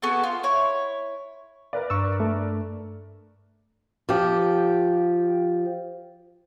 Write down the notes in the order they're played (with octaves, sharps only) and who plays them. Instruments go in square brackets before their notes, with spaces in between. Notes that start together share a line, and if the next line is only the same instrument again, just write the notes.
[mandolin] B3 F#4 G#4 A4
F4
E4 C#5
[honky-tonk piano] A#4 B4 D5
[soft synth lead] G2 [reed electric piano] C#6 E6
[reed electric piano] A3
[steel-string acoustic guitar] F3 G4